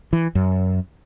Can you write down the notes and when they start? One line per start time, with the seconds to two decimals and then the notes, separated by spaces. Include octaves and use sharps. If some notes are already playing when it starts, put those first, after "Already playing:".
0.13 E3
0.35 F#2